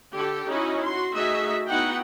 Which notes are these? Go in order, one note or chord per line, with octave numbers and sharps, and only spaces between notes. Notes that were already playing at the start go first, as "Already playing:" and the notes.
D3 G4 A4
C#4 D#4 E4 F#4 D#5
F#4 C6
A3 D#4 F#4 G#4 D#5 E5
B3 D#4 E4 F#4 F#5 G5